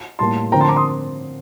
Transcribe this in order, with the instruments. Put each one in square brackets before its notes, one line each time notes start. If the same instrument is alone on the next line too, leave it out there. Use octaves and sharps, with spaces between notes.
[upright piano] A2 G3 A#3 [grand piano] A5 C6
[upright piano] D3 F3 C4 F4 A#4 [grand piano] G5 A#5
[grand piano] A5 C6
A#5 D6
C6 D#6